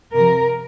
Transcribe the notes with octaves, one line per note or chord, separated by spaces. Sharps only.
C3 F3 A#4